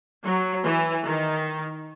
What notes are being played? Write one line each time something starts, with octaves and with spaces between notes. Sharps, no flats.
F#3
E3
D#3